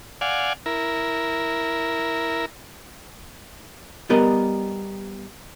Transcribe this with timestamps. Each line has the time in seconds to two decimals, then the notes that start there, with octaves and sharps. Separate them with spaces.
0.21 D5 F5 F#5 G#5
0.66 E4 A#4
4.09 G3 B3 G4 A#4 D5 D#5